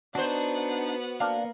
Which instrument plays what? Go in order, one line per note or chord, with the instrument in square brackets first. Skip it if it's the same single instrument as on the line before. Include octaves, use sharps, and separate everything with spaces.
[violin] B3 F#5 [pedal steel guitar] D4 D#4 [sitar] F#4 C5
[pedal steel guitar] A#3 [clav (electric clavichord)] D4 F5